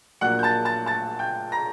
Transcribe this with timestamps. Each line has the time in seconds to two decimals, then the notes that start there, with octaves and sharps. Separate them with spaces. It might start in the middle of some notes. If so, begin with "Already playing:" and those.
0.21 A#1 A#2 F#3 A#3 D4 F#5 F#6
0.39 G6
0.43 A5 A6
0.65 A5 A6
0.86 A5 A6
1.19 G5 G6
1.52 A#5 A#6